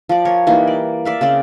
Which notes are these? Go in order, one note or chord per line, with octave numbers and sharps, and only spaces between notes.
F3 D5
A#4 C#5
E3 G3 A#3 D#4
D5
D5 E5 F5
C#3 C4 D5